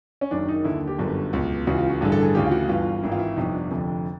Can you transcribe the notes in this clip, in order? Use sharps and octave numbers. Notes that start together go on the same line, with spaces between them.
C#4
F#1 F#2 D#3 D4
D#4
D#2 D3 E4
G4
G1 F#2 D3
C#2 B2
C#2 C#3 E3 F#4
F4
F#4
A1 G2 D3 G#4
A4
G#4
D2 C#3 E3 G4
F4
F#4
G1 G2 E3 F4
G#1 G#2 E3 E4
F4
E4
G1 F2 C3 D#4
D4
F1 F2 D3